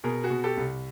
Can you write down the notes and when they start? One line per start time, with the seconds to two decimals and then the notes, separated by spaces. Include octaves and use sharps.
0.04 B2 G#4 A#4
0.23 F#4 G#4
0.30 B2
0.44 G4 A4
0.57 C2